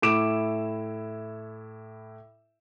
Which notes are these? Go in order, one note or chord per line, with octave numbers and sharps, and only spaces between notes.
A2 E4 D6 D7 E7